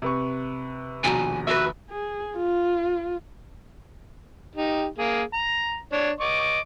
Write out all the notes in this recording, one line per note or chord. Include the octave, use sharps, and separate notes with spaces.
C3 B4 C#6
D#1 A#1 B2 G#5 A#5
F#4 B4 E5
G#4
F4
D#4 G4
A#3 G#4
A#5
D4 C#5
D#5 C#6 D6